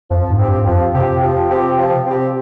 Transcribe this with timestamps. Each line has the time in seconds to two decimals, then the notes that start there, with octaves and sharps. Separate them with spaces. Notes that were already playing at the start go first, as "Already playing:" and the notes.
0.10 F2 F3
0.30 G#2
0.39 C4 G4
0.48 G2
0.66 F2 F3
0.94 C3 C4 G4
1.23 F3
1.51 C4 G4
1.79 F3
2.07 C4 G4